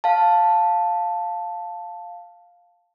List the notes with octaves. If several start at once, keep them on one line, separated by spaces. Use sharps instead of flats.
F5 A5